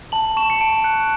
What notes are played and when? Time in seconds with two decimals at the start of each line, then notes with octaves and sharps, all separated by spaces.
0.12 A5 F#7
0.37 C#6 E7
0.50 C#7
0.61 A5 D7
0.84 F#6 C#7